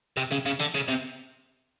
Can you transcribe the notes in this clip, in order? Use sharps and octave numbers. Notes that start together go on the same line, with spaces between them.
C3
C#3
C#3
D3
C#3
C3